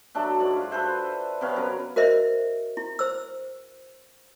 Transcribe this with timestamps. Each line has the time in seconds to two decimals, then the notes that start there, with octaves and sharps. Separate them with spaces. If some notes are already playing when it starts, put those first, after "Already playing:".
0.15 F#3 D4 A4 E5
0.40 G#2 F#4 D5
0.57 F4
0.71 A4 B4 C5 E5
1.41 C3 B3 C#5 F5
1.56 F#2 A#4 B4
1.96 F#4 A#4 C5 D#5 E5
2.77 E4
2.99 C5 E6